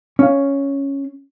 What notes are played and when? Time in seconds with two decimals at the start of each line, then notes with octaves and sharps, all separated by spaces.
0.19 C#4 F5